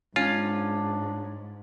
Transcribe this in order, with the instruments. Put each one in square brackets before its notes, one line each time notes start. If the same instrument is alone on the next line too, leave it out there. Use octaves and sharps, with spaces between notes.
[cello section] G#2 [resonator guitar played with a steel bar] C#4 [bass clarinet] D4 [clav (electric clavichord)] F4